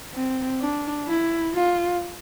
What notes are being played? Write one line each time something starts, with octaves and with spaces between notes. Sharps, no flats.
C4
D4
E4
F4